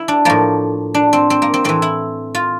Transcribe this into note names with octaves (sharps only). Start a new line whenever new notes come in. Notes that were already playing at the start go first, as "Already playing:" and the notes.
Already playing: E4
D4
A2 F3 A#3
D4
C4
C4
A#3
C4
A2 E3 C4
E4
F4